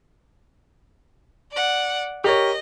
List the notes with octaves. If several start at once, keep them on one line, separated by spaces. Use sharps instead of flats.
D5 F#5
G4 A#4 C#5 D#5